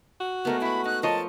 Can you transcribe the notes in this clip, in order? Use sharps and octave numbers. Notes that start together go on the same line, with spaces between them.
F#4
G#3 A3 B3 A#4
E4 B4 B5
D#4 F#6
F3 A#4 C#5 D#5 A5